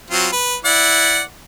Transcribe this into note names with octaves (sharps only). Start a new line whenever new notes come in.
F#3 C4 F4
B4
E4 D5 F#5